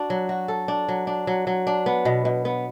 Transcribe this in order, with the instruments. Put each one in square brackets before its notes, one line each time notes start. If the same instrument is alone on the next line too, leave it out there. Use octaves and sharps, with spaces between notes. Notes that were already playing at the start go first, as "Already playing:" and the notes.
Already playing: [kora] D4 F#4
F#3
F#4
A4
D4
F#3
D4
F#3
F#3
D4
B3
B2
B2
B3